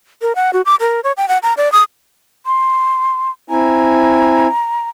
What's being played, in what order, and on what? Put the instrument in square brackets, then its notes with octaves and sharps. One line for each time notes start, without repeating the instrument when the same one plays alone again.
[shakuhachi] A#4
F#5
F#4
D6
A#4
C#5
G5
F#5
A#5
D5
D#6
[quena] C6
[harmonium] C4 E4 G#5 [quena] A#5